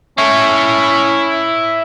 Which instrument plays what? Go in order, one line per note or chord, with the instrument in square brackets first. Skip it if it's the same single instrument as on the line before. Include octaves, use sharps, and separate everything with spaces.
[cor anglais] C#4 [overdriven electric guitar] E4 C#5